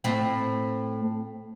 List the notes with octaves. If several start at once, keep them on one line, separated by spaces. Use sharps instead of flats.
A2 C4